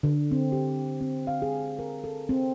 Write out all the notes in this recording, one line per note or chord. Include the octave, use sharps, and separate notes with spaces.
D3
C4
G4
C4
F5
G#4
A#4
A4
C4